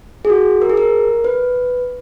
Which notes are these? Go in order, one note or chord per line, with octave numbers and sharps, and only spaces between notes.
G#4
F#4
A#4
G#4
A#4
B4